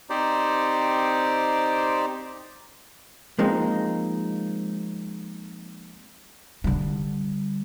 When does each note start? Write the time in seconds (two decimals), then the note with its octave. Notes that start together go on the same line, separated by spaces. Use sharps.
0.10 C4 D#4 G4 C5 D5
3.39 F3 G#3 A#3 C4 D#4
6.64 D3 G3